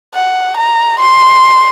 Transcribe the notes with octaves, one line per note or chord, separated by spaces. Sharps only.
F#5
A#5
C6